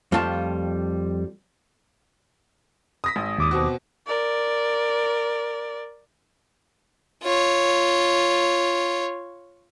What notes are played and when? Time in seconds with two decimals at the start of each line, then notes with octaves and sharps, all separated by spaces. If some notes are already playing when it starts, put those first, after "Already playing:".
0.12 F2 G3 A3 F4 A5
3.04 D#6 A#6 B6
3.16 G#1
3.38 D#2 D6 D#6
3.51 B2 C4 F#4
4.07 A#4 D5
7.23 F4 C#5